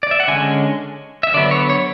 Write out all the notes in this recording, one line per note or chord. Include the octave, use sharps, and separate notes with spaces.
D5
E5
F#5
D3 G#3 C#4 G#5
E5
D3 F#3 B3 D5
C#5
C#5